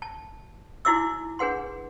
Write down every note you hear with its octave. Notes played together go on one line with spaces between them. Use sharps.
A5
D#4 E4 F#4 E5 D6 E6
D4 G#4 B4 F#5 C6